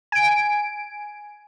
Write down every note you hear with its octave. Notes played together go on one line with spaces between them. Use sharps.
G#5 D7